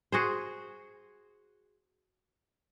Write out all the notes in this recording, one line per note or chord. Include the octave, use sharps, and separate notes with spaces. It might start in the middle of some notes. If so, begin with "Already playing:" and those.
F#4 G#4 C5